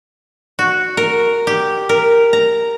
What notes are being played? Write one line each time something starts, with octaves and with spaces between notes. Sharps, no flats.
F#4
A#4
G4
A#4
A#5